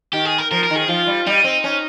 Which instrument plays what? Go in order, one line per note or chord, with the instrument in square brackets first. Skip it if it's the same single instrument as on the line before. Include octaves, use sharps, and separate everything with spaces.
[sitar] D#3 [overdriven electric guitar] G4
[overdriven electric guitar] G#4
A#4
[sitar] F3 [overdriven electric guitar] A#4
[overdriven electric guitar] A#4
[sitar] D#3
[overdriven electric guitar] G#4
[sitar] F3 [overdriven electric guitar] F4
[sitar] G3
[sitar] G3 [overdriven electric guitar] D#4
[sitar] C4
C#4